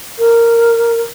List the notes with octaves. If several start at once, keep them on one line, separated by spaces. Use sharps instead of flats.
A#4